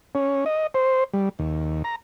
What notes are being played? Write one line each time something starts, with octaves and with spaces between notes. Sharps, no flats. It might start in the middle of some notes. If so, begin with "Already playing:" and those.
C#4
D#5
C5
G3
D#2
A#5